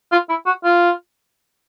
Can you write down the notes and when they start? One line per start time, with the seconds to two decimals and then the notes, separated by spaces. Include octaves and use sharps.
0.12 F4
0.29 E4
0.46 F#4
0.65 F4